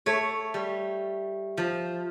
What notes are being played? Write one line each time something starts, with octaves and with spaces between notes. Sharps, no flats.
A3 C#5
G3
F3